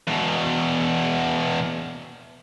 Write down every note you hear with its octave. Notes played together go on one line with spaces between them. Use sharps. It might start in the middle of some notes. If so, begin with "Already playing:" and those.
E2 B2